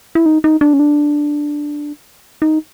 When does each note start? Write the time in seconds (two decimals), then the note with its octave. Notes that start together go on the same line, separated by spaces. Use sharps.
0.15 E4
0.26 D#4
0.44 D#4
0.61 D4
0.73 C#4
0.79 D4
2.42 D#4